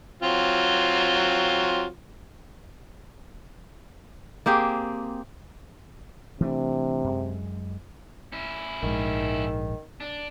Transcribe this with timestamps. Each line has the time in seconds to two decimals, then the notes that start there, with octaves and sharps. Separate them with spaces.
0.22 F#3 C4 F4
4.46 A#3 C4 G4 G#4
6.40 C3 E3 A3 D4
7.04 F#2 G#3
8.32 C#4 E4
8.83 A#1 G#2 D#3
10.00 D4